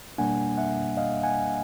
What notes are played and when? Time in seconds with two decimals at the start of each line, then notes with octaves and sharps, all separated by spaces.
0.18 B2 G3 A#3 D4 F#5 G#5
0.58 E5 F#5
0.97 D#5 F5
1.23 F#5 G#5